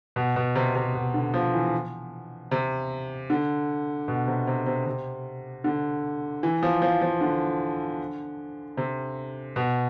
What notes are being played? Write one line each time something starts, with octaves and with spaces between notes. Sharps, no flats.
B2
B2
C3
C3
B2
D3
F3
E3
C3
D3
B2
C3
C3
C3
C3
D3
E3
F3
F3
F3
D3
C3
B2